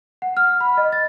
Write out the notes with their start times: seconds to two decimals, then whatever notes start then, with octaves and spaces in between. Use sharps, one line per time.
0.22 F#5
0.37 F6
0.61 B5
0.77 D#5
0.92 A6